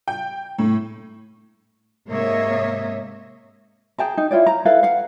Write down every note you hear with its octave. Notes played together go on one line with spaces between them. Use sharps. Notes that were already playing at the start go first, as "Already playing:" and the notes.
G5
A2
G#2 C3 A#3 C#5 D#5 E5
G#4 G5 A5 A#5
D#4
E4 F4 C#5 D5
A#5
E4 A4 B4 F5
F5 F#5